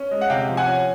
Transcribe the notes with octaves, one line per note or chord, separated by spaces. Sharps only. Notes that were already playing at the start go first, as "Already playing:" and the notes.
Already playing: C#4
G#3
F#5
C3 F5 G5
F3
F#5 G#5
C#4